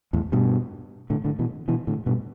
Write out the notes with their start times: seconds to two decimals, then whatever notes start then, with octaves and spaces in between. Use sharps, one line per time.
0.13 E2 A2
0.32 G2 B2
1.10 A2 D3
1.24 A2 D3
1.39 B2 E3
1.68 B2 E3
1.87 A2 D3
2.06 G2 B2